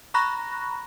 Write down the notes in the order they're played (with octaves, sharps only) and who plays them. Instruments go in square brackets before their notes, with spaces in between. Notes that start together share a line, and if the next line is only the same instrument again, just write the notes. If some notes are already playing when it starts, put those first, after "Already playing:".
[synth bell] A#5 B5 C#6 F#6 A#6